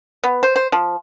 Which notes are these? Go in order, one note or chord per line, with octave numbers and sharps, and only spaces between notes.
B3
C5
C5
F3